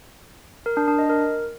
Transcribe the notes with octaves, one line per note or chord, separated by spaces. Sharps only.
A#4
D4
D4
D#5
A#4